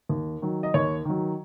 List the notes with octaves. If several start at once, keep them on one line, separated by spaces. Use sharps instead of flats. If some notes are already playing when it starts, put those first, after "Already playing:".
D#2
D#3 F#3
D#5
D#2 C#5
D#3 F#3